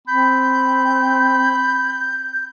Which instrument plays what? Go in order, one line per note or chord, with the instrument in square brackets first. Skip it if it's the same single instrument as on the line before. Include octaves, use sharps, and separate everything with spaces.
[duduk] C4 [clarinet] B5 [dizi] G6